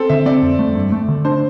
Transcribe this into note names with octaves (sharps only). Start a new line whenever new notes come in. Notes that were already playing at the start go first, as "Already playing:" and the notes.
Already playing: C4 A4
D3 E5
C4 D5
F2
A3
G2
A3
D3
D4 C5